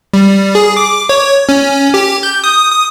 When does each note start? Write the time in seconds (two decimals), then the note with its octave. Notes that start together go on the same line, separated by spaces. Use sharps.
0.13 G3
0.55 G#4
0.77 D6
1.09 C#5
1.49 C#4
1.94 G4
2.23 G6
2.44 D#6
2.71 D#6